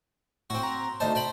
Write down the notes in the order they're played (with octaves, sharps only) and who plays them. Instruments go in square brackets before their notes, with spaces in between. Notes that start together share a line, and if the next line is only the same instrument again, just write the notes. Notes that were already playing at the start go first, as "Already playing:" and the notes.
[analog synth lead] A2 [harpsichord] C4 F#4
[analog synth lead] A#5
[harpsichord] D2 D#4 C5 [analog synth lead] A5
[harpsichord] C5 G5 B5